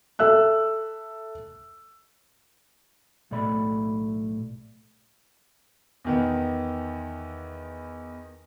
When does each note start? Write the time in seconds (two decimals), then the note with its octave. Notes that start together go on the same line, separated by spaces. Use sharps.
0.19 A4 E5 E6 F#6
3.31 B1 A2 A3 D5 B5
6.05 E2 D#3 B3